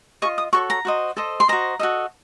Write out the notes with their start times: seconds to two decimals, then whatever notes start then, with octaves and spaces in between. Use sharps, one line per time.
0.22 F4 A4 D#5 C#6
0.38 D#6
0.53 F#4 A4 C#5 C#6
0.70 A#5
0.85 F#4 C5 D#5
1.17 A4 C5 D#5
1.40 C6
1.48 F#4 C5 D#5 A#5
1.79 F#4 A4 D#5